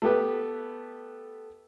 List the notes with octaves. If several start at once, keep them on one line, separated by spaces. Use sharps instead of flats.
A3 B3 G4 B4